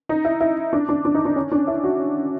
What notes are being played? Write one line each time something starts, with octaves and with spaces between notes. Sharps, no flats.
D#4
E4
E4
D4
D4
D4
D#4
D4
C#4
D4
E4
F#4